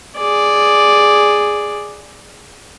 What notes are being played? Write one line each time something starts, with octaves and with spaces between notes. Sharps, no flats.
G#4 D5